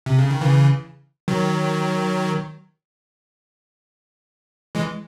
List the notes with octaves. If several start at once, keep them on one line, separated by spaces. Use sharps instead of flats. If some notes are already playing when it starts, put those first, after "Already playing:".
C3
C#3
D#3
C#3 E3
D#3 F#3
E3 G#3